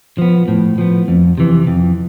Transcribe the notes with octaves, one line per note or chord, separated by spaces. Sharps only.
F3 B3
A2
F3 B3
F2
C3 E3
F2